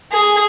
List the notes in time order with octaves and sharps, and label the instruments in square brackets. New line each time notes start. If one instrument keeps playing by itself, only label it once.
[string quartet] G#4